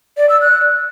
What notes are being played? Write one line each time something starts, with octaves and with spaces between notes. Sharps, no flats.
D5
E6
F#6